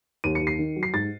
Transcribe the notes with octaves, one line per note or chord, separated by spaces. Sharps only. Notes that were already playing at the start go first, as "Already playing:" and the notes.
D#2 D#7
C#7
D#2
C7
D#3
F#3
C7
G#2 A6